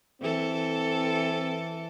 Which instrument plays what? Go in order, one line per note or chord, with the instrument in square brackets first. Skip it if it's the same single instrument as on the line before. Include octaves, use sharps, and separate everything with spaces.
[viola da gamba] E3 A4 [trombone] C4